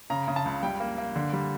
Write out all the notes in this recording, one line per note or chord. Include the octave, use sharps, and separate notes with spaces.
C#3 A#5
C#3
A5
C#2
G3 G5
A#3
A#3
D3
G3